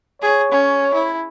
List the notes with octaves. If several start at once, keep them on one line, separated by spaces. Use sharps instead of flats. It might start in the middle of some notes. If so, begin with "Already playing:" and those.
G#4 C#5
C#4
E4